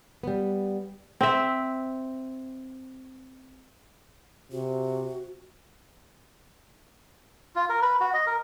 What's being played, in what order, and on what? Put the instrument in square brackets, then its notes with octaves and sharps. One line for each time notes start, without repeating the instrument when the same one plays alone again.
[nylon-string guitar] G3 B3
[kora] C4 E5
[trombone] C3 [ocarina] F#4
[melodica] F4
A#4
B4
F#4
D#5
A#4